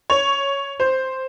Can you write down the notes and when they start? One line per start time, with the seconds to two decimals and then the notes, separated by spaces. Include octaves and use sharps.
0.10 C#5
0.80 C5